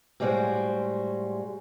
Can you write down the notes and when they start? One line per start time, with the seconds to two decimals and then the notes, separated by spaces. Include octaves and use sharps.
0.20 A2 G3 G#3 B3 F#4 C5